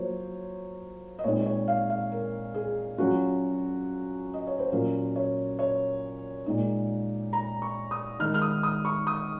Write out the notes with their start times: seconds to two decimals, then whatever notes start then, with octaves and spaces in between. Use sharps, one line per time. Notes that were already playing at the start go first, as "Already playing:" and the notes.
Already playing: F#3 A#3 F4 C5 C#5
1.19 D#5
1.24 A#2 G#3 C4 D#4 C#5
1.46 C#5
1.68 F5
1.90 F5
2.12 A#4
2.54 G#4
2.98 F#3 C#4 F4 F#4
4.34 D#5
4.47 C#5
4.59 C5
4.72 A#2 F#3 C#4 F4 A#4
5.16 C#5
5.59 C#5
6.46 A#2 G#3 D#4
7.33 A#5
7.62 C#6
7.91 D#6
8.19 D#3 G#3 D#4 F6
8.34 F6
8.42 D#6
8.63 D#6
8.85 C#6
9.07 D#6